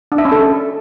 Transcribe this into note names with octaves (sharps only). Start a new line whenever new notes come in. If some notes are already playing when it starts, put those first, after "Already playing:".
D4
E5
C#4
A4